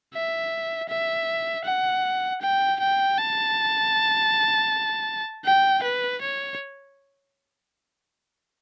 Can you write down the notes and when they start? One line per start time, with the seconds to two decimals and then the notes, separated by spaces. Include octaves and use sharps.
0.14 E5
0.89 E5
1.65 F#5
2.42 G5
2.80 G5
3.17 A5
5.45 G5
5.83 B4
6.21 C#5